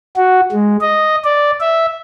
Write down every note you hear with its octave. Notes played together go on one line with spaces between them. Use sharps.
F#4
G#3
D#5
D5
E5